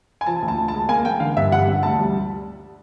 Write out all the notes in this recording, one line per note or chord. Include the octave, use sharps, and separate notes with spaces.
G#5
F3 A5
D2
A5
D2
A5
G#3
A#3 G#5
A#3 G5
D3 F5
G2 E5
G3 F#5
D3
D2 A5
G3